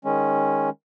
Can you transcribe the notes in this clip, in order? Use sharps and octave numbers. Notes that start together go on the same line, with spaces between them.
D#3 G#3 C#4